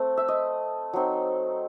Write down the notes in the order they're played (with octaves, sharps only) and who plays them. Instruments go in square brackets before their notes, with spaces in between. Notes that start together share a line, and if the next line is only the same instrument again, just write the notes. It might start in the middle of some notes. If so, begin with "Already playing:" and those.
Already playing: [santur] A3 C4
E5
D#5
F#3 C4 D#4